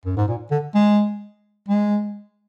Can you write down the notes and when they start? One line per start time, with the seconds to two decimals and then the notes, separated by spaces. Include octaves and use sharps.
0.06 F#2
0.17 G#2
0.28 A#2
0.51 D3
0.75 G#3
1.69 G#3